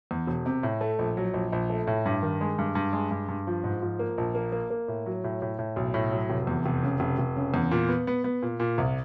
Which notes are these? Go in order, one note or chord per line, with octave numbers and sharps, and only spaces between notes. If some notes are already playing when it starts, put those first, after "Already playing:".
E2
E1
C3
A2
A3
A#1
F#3
A#1
A#1
A3
A2
G2
D#3
G#3
G2
G2
G#3
G2
G2
F3
G#2
F3
A#3
A#1
A#3
A#3
A#3
A2
F#3
A2
A2
A2
B1
A2
F#3
F1
E2
F1
C#3
F1
F1
C#3
E2
A#2
B3
B3
B3
A#2
A#2
C2